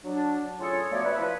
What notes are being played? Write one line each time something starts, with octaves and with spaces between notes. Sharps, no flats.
F#3 D4
A2 C#4 F4 G#4 A4 C#5
F3 F#3 A3 B3 C#5 D5
B4 E5
F3 E4 B4